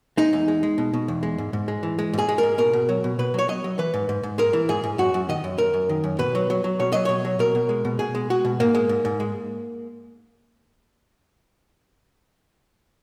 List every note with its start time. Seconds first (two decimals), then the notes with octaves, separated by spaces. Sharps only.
0.17 G#3 D#4
0.33 E2
0.48 G#3
0.63 G#3
0.78 B2
0.93 B2
1.08 E2
1.23 G#3
1.38 G#2
1.53 G#2
1.68 G#3
1.83 E3
1.99 G#3
2.13 G#2
2.18 G#4
2.29 G#3
2.38 A#4
2.43 G#2
2.58 B2 A#4
2.73 B2
2.89 F#3
3.04 B2
3.19 B2 B4
3.34 F#3 C#5
3.48 F#3 D#5
3.64 F#3
3.79 E3 B4
3.94 G#2
4.09 G#2
4.23 G#2
4.38 G#3 A#4
4.53 E3
4.69 G#2 G#4
4.84 G#2
4.98 F#2 F#4
5.14 F#2
5.29 D#3 D#5
5.44 F#2
5.58 F#2 A#4
5.74 F#2
5.89 D#3
6.04 F#2
6.19 B2 B4
6.35 F#3
6.50 F#3
6.64 F#3
6.80 B2 C#5
6.92 F#3 D#5
7.05 B2 C#5
7.25 F#3
7.39 B2 A#4
7.55 B2
7.69 G#3
7.85 B2
7.99 B2 G#4
8.15 G#3
8.30 G#3 F#4
8.45 B2
8.60 G#2 A#3
8.75 G#3
8.89 G#2
9.05 G#2
9.20 G#3